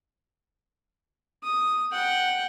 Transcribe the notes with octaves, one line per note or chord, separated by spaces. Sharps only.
D#6
F#5 G5